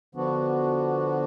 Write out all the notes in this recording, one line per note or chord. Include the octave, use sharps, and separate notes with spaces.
D3 F3 B3 D4 F#4